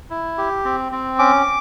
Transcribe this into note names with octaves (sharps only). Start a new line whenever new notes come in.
E4
G4
C4
C4
C#4 D6